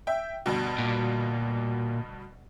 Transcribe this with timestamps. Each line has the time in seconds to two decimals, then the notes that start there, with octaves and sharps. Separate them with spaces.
0.07 E5 G5
0.46 D2 G2 B2
0.79 A#2